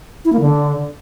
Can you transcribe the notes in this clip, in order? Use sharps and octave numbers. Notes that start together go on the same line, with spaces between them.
E4
A#3
D3